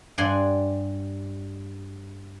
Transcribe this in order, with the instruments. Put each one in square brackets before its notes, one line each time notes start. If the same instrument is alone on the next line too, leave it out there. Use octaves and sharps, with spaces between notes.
[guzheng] G2 D5 F#5 G#5 C6